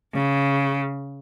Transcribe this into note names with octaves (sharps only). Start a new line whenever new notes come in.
C#3